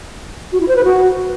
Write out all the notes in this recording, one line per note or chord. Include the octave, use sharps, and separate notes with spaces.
F#4
E4
C5
B4
F#4